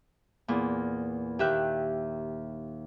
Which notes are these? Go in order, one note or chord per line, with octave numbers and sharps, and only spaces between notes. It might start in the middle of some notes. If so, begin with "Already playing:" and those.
E2 A#2
D#2 D#3 G4 E5 E6 F#6